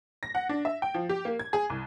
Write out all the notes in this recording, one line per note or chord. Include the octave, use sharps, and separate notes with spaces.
A#6
F#5
D4
E5
G5
F3
G4
A#3
G#6
G#4
C2